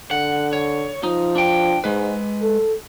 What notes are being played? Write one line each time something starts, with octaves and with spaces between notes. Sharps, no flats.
D3 F#5
C#5
F3 D#4
D4 G5
G#2 G#3 B4
A4